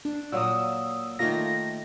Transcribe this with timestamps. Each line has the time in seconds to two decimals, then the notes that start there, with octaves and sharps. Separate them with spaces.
0.05 D4
0.32 A#2 F#3 A#3 D#6 E6
1.19 D#3 A3 A#3 F4 A#6